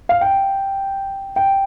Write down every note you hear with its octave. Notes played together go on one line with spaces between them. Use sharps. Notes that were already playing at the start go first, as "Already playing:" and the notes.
F5
G5
G5